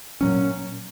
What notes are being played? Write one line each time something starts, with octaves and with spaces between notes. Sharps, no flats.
A#2 F#3 C#4